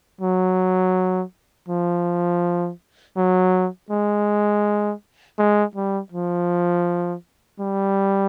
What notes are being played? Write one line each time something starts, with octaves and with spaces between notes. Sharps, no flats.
F#3
F3
F#3
G#3
G#3
G3
F3
G3